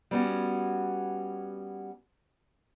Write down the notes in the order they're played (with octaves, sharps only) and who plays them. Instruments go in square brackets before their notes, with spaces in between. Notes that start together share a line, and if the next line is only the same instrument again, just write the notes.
[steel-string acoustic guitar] G3 B3 C#4 F#4